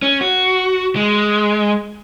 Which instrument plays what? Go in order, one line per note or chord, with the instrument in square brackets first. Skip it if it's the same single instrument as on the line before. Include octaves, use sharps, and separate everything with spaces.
[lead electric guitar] C#4
F#4
G#3